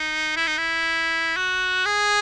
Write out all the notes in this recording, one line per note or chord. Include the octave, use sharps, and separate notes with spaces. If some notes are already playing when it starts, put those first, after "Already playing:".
Already playing: D#4
E4
D#4
E4
F#4
G#4